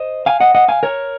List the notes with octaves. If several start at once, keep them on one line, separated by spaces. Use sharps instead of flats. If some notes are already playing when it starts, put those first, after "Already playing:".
Already playing: C5 D#5
F5 G#5
D#5 F#5
D#5 F#5
F5 G#5
A#4 C#5